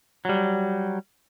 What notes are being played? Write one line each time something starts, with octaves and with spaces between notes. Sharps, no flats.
F#3 G3